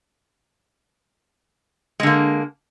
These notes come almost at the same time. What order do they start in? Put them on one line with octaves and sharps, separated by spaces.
G#3 D3 A#3